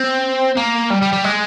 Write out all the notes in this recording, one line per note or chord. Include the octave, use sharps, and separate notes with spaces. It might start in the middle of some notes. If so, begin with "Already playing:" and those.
Already playing: C4
A#3
G3
G3
G3
G#3